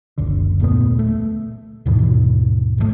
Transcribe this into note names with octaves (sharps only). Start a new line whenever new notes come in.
F#1 C#2 D3
D#1 A#2 A3 B3
A3
D#2 G#2 B2 E3
G#1 D3 A3